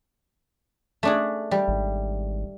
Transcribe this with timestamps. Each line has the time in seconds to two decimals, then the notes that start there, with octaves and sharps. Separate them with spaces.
1.03 A3 D4 G#4
1.51 G3
1.68 G#1